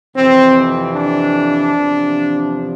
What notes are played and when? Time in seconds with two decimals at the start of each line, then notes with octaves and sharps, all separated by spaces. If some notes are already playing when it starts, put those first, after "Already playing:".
0.15 F2 C3 E3 C4
0.94 D4
1.75 E2 C3 F3